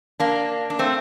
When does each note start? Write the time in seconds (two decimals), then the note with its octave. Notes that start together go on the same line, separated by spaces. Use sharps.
0.20 A#3 D4
0.70 D4
0.79 A3 C4